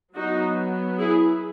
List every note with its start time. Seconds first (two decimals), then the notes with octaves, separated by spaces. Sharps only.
0.16 F#3 B3 D#4 F#4
0.99 E4 G#4